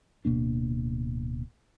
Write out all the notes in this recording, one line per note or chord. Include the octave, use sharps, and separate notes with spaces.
D1 B2 A#3 D4